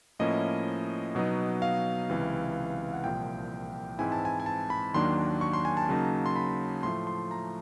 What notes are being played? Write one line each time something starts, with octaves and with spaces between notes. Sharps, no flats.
A2 F3 A#3 C#4 E4 D#5
B2 F#3 B3 D#4
F5
C#2 C3 E3
F#5
C2 A#2 F3 G5
G#2 E3 G#3 C4 E4 G#5
A5
G#5
G#5
A5
B5
D#2 D#3 F#3 A#3 D4 C6
C#6
C6
G#5
A5
C#3 F#3 A#3 D#4
C6
B5
A2 F3 A3 C6
C6
A#5